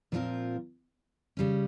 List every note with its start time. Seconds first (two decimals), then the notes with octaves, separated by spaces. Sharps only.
0.12 A#2 F3 C4 F4 A#4
1.37 C#3 G3 C#4